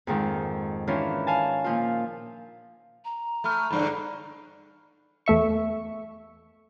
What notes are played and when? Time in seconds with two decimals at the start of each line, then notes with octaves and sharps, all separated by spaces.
0.07 F2 G#2 D#3
0.87 D#3 E3 C#4 D4 F4 C#5
1.27 F5 G#5 A5
1.64 A#2 F3 F4
3.05 A#5
3.44 A3 B5 F6
3.71 E2 G2 D3 D5 B5
5.26 E2 A3 E5 C#6